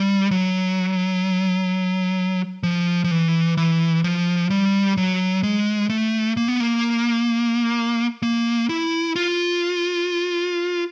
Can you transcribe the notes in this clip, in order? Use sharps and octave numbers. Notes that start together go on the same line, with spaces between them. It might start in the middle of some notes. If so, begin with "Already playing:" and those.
Already playing: G3
F#3
F3
F3
E3
E3
F3
G3
F#3
G#3
A3
A#3
B3
A#3
A#3
E4
F4